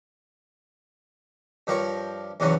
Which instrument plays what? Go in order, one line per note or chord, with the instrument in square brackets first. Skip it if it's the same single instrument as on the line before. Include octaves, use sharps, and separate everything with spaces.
[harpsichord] G2 F3 G3 A#4 C#5
E2 G2 C3 E3 F#3 C#4